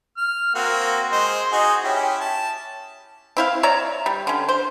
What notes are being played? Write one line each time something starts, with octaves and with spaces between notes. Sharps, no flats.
F6
A#3 C4 F#4
G#3 C5 D#5
D#4 F#4 G#4
C#4 E4 G4
A5
C4 E4 F5
C#5 D5 E5 A#5
G3
D3 C#4
C5